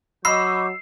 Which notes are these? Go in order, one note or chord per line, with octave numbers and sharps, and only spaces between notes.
F#3 D#5 B5 C#6 D6 E6 G6 C7